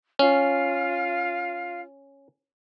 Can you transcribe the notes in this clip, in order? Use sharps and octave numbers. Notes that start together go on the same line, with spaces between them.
C#4 F4 F5